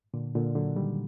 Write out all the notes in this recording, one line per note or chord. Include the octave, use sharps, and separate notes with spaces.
A#2 D3
A#2 D3
D3 F#3
D#3 G3